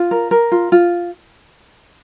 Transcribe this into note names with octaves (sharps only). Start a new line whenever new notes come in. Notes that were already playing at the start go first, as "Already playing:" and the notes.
Already playing: F4
A#4
A#4
F4
F4